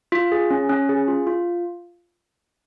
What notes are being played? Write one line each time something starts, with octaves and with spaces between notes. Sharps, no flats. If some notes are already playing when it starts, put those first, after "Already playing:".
F4
G#4
C#4
C#4
G#4
F4
F4